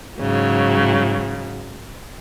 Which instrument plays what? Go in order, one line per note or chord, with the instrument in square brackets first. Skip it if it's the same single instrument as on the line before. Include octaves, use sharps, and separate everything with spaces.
[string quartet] G#2 C#3 F#3